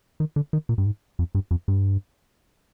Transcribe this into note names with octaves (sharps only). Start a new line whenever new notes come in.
D#3
D3
D#3
A#2
G2
G#2
F2
G2
F2
G2